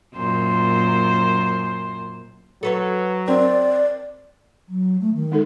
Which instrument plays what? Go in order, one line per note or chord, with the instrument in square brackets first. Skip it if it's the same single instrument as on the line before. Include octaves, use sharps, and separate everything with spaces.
[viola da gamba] F#2 A#2 C5
[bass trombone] F#3 [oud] A4 B4 C#5
[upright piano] C4 [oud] A#4 [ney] D5
[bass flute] F#3
A3
D#3
[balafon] G#3 D#4 A4